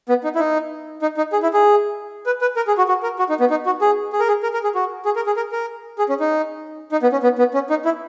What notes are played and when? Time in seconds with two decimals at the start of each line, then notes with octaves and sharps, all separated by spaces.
0.09 B3
0.24 D#4
0.35 E4
0.39 D#4
1.02 D#4
1.17 D#4
1.33 G#4
1.43 E4
1.53 G#4
2.26 B4
2.41 B4
2.56 A#4
2.67 G#4
2.78 F#4
2.88 F#4
3.03 A#4
3.19 F#4
3.29 D#4
3.40 B3
3.50 D#4
3.66 F#4
3.81 G#4
4.13 G#4
4.20 A#4
4.28 G#4
4.43 A#4
4.54 A#4
4.63 G#4
4.75 F#4
5.05 G#4
5.16 A#4
5.26 G#4
5.36 A#4
5.52 A#4
5.99 G#4
6.09 C#4
6.20 D#4
6.92 D#4
7.03 B3
7.12 C#4
7.23 B3
7.38 B3
7.54 C#4
7.70 D#4
7.85 E4